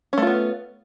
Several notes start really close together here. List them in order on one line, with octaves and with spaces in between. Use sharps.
C#4 A3 F4 B3